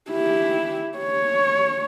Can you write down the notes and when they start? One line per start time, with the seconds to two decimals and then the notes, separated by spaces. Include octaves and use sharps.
0.11 E4 G4
0.98 C#5